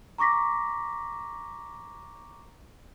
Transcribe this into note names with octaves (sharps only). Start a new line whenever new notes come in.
A#5 C#6 D6 A#6 B6